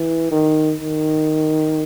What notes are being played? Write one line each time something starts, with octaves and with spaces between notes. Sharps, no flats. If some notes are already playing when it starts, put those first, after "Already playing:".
Already playing: E3
D#3
D#3